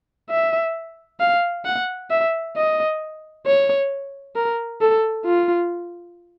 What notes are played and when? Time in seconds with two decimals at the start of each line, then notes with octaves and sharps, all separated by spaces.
0.30 E5
1.20 F5
1.65 F#5
2.10 E5
2.56 D#5
3.46 C#5
4.35 A#4
4.81 A4
5.25 F4